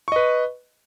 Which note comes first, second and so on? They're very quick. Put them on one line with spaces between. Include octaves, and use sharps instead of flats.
C#6 D#5 B4